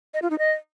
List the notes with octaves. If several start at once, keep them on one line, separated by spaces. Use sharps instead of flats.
D#5
F4
D#4
D#5